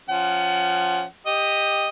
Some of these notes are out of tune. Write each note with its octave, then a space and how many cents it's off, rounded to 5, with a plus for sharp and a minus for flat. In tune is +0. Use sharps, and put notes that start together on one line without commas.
F3 +0 C#4 +0 F#5 +25
G4 +15 D#5 +0